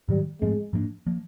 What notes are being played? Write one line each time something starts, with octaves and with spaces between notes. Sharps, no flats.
G#2 D#3 F#3 G3
G#2 F3 G#3 A3 C4
G#2 F3 A#3 D4
F3 A#3